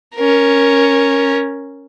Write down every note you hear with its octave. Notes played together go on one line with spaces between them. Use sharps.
C#4 A#4